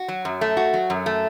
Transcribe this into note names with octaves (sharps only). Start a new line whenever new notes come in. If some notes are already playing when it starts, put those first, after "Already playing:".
Already playing: F#4
F#3
F#2
A3
F#4
F#3
F#2
A3